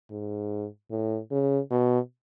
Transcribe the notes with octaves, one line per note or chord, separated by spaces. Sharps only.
G#2
A2
C#3
B2